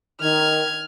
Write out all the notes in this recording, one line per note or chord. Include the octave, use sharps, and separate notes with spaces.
D#3 F6 G#6